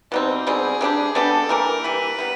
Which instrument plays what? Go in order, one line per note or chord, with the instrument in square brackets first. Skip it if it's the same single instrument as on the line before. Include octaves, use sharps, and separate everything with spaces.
[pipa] B2 G3 C4 [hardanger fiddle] D#4
[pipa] B2 G3 C4 [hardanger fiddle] G#4
[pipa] G3 B3 D4 G4
[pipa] G3 B3 D4 G4 [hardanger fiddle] A4
[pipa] E3 G3 A#3 [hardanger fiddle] A#4
[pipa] E3 G3 A#3 [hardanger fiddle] B4
[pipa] G3 B3